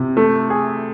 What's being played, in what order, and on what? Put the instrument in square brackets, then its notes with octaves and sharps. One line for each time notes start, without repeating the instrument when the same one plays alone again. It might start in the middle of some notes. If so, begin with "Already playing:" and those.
Already playing: [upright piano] C3
A3
G#4